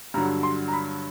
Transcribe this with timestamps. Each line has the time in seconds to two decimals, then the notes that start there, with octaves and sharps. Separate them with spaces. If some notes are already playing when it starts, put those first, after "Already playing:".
0.14 G2 D3 F#3 A#5
0.43 C6
0.68 A#5
0.73 B5